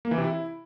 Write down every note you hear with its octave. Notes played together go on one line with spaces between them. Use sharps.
A#3
E3
C3
E4